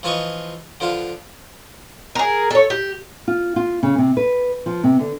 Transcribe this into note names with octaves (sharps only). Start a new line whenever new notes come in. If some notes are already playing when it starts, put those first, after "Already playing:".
E3 F3 F4 B4 D#5 C#6
D3 F3 F4 B4
G#4 A#4
A4 C#5
G4
F4
F4
C#3
C3
B4
F3
C3
D3